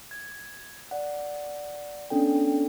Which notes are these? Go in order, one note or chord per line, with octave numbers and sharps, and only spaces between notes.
G#6
D5 F#5
B3 C#4 D4 A4 G5